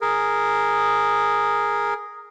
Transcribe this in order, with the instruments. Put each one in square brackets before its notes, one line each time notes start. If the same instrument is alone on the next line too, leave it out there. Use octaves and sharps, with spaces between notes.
[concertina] G#4 A#4